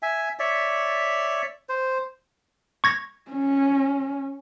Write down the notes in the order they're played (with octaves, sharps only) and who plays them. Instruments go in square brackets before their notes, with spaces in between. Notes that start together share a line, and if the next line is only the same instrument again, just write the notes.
[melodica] E5 G#5
C#5 D5 E5
C5
[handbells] C#6 G#6 A#6
[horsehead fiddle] C#4